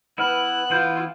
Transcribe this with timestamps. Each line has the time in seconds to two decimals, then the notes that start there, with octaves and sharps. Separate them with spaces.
0.18 B3 E4 B4 F6 F#6
0.70 E3 E4 F4 G6